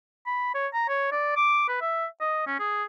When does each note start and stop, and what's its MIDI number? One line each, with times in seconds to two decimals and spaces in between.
0.26 0.53 83
0.54 0.67 73
0.74 0.87 82
0.89 1.10 73
1.12 1.36 74
1.36 1.66 86
1.68 1.78 71
1.81 2.06 76
2.20 2.44 75
2.47 2.55 61
2.60 2.84 68